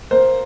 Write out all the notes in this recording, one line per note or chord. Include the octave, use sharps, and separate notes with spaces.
A#3 C5